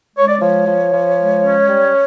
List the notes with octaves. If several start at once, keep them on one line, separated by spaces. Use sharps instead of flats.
G#3 C#5
D5
F3 C#5
F3
F3
G#3
C#4
G3